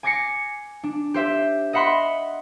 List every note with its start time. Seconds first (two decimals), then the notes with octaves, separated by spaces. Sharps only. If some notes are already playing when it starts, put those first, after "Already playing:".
0.03 G#5 D6 G#6 A#6 C7 C#7
0.84 D4
1.14 G4 C5 E5
1.73 D#5 E5 F#5 B5 C6